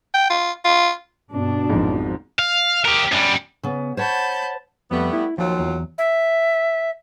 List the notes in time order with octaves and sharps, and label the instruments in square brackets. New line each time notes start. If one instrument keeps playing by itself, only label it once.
[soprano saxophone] G5
F4
F4
[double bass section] G2 [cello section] B2 D4
[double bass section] G#1 F3 F#3 [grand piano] F2 G#2
[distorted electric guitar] F5
G4 A#4
F#2 G3
[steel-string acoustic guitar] C#3 B3
[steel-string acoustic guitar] C5 C#5 F#5 [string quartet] A5 B5 G6
[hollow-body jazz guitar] F2 [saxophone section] G3 A3 B3
[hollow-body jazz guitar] E4
[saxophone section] D#2 F#3 F4 [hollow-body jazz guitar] F3
[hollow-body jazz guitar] E2
[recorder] E5